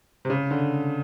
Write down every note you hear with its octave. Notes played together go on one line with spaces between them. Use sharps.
C3
C#3
D3